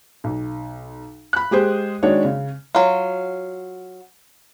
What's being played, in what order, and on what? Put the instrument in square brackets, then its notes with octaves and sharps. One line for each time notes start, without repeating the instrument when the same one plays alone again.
[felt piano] B1
B5 F#6
G#3 G4 G#4 C5
D#3 G#3 D4 F#4 C#5
C#3
[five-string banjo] F#3 F4